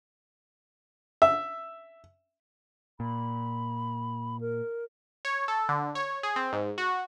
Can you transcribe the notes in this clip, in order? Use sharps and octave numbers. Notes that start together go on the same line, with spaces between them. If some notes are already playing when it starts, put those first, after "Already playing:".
E5
A#2 B5
A#4
C#5
A4
D3
C#5
G#4
C4
G#2
F#4